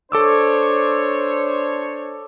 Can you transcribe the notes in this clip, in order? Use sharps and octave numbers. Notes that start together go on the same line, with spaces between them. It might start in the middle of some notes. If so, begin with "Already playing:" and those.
D4 A4 C5 C#5 D6 E6